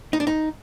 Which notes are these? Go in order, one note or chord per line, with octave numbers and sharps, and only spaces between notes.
D#4
D4
D#4